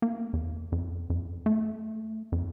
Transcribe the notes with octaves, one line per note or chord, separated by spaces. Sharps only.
A#3
E2
F2
F2
A3
F2